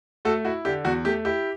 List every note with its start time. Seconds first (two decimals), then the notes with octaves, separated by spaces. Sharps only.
0.25 A3 F#4 A4
0.45 E4 F#4
0.65 D3 G4
0.85 E2 F#4
1.05 A3 G4
1.25 E4 G4